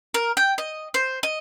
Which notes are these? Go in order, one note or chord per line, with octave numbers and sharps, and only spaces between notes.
A#4
G5
D#5
C5
D#5